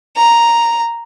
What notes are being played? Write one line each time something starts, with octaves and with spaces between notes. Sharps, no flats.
A#5